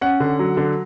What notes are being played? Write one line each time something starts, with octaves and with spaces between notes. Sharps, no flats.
C#4 F#5
D3
F#3
D3